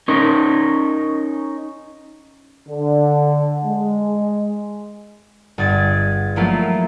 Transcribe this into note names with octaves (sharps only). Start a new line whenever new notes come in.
C#4 D#4 A#4
D3
G#3
G1 G#4 G#6 A6
F3 F#3 A3 A#3 E4 F4